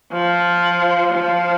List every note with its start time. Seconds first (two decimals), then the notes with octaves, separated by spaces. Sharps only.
0.13 F3
1.13 F3